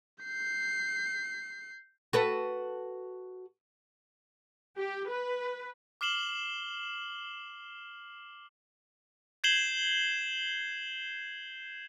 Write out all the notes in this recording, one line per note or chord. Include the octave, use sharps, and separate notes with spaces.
G6 C7
F#4 A4 B4
G4
B4
D6 F6 C7 E7 F#7 G7
G6 G#6 C7 E7 F#7 G7